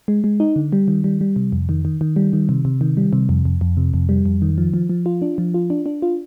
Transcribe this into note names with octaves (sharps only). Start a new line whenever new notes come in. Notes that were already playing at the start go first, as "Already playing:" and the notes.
G#3
G#3
D#4
D3
G3
D#3
G3
G3
C3
F2
D#3
D#3
D#3
G3
D#3
C3
C3
D#3
G3
C3
F2
F2
F2
C3
F2
G3
F2
D#3
F3
F3
F3
F4
D4
F3
F4
D4
D4
F4